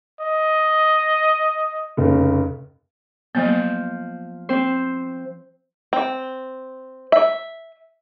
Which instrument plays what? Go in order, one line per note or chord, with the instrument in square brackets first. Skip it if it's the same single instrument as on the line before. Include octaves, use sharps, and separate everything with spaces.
[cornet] D#5
[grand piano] F1 C#3
[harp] F3 G6 [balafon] F#3 A#3 B3
[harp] C4 C5
[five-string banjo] C4
E5